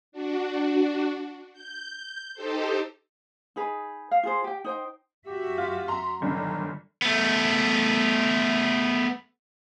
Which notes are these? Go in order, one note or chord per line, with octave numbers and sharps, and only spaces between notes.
D4 F#4
G6
D#4 G4 A4 C5
D#4 G#4 B4
F5
F4 G#4 C5
G4 G5
D#4 C5 G5
F#2 F#4 G4 E5
F4
A#5 C6
G1 A#2 D3 D#3 F#3 D4
A3 B3